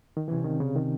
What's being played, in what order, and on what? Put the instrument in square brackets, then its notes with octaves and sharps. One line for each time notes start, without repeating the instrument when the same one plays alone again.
[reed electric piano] D#3
[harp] C2 C3 F#3 C#4 [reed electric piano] E3
[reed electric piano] D#3
C#3
D#3